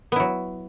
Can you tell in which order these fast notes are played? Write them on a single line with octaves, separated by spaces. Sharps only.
B3 E4 F#3